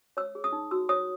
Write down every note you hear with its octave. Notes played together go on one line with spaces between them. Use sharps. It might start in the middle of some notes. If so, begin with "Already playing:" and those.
C#5 E6
G#4
D#6
D#4
F#4 E6
C#5 D#6